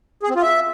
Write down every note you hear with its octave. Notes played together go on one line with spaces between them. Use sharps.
G#4
C4
F4
E5